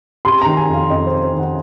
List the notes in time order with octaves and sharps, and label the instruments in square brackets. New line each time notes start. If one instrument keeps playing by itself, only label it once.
[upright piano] C3 C6
D#3 A#5
G#5
F2 F5
F2 D#5
C3 C5
C5
D#3
F#5